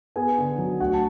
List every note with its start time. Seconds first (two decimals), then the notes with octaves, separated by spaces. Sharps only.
0.16 B3 G#4 G#5
0.38 D3
0.58 F#3
0.80 D2 F#4 F#5
0.94 A5